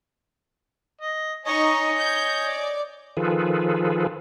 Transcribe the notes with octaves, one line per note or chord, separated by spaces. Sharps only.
D#5
D#4 C#5 D#5 G#5 C#6
G6
D5
D#3 F3 F4 G#4 A4 B4